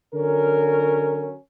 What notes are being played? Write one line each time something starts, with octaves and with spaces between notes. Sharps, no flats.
D3 F#3 C#4 A#4